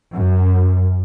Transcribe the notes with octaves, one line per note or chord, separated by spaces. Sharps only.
F#2